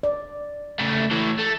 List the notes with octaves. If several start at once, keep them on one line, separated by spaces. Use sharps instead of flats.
D5
C#3 A3
A2 E3
A3